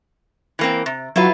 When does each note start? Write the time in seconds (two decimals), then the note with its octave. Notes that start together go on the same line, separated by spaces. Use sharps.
0.59 E3 A#3 C4
0.86 C3
1.16 F#3 E4 F4 B4